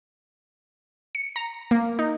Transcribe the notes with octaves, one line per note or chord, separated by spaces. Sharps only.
C#7
A#5
A#3
D#4